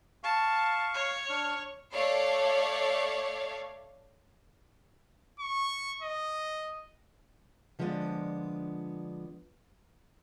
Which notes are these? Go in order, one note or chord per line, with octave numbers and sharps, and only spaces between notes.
F5 A5 C#6
C#5
D4 F6
A3 C#5 D5 F5
C#6
D#5
D3 F3 G#3 B3 D4